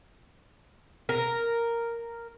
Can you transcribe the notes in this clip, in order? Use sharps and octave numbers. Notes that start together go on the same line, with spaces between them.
A#4